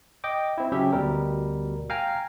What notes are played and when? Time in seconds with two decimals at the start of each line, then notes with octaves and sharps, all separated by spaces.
0.24 D#5 G5 D6
0.58 C4 E4
0.72 C#3 F#3 C#4 G4 E5
0.93 D2 B2 G3 A#4
1.90 F5 G5 G#5 A#5 F6